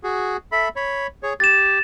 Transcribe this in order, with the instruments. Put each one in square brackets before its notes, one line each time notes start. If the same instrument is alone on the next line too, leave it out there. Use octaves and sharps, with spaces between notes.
[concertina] F#4 G#4
A4 E5 B5
C#5 B5
G#4 C#5
[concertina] G4 [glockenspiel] A6 E7